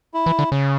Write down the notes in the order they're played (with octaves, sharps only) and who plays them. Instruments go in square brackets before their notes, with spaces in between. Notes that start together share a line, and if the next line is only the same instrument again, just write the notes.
[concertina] E4
[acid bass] E3
D3
C#3